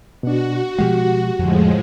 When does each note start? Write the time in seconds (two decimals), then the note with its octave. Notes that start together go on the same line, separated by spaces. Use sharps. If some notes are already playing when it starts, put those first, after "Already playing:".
0.23 B2 D4 F#4
0.79 B2 F3 G#3 G4 F#5
1.39 F2 A2 D3 F3 G#3